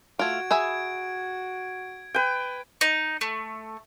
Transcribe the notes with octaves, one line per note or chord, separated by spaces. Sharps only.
A3 F4 F#4 G#6 D7
G#4 E5 B5
B4 G5
D#4
A3